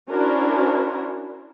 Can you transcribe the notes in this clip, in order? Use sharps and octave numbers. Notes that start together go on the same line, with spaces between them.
C#4 D4 E4 F#4 A#4 C5